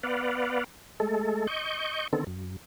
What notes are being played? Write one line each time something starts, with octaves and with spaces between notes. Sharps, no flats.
B3 B4 D5 F5 F#5
G#3 A3 A4
D#5 C#6 G6
D3 D#3 B3 C4 A4
F#2